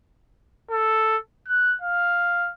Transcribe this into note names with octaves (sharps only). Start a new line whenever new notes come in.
A4
F#6
F5